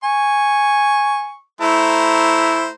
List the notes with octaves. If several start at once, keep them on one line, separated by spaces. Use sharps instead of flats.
G#5 C#6
A3 E4 C5 A#5